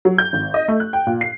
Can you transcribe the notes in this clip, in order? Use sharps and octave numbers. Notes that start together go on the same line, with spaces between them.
F#3
G6
G#1
D#5
A3
F#6
G5
A#2
C7